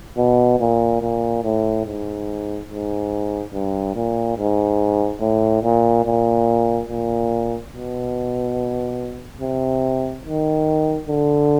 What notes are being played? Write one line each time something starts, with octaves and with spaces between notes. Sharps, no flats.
B2
A#2
A#2
A2
G#2
G#2
G2
A#2
G#2
A2
A#2
A#2
A#2
B2
C3
D#3
D3